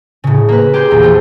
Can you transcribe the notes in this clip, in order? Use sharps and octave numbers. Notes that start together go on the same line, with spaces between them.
A2 C#3
A#3 B4
G4 G#4 C6 G6
A#1 E2
A3 F4 C5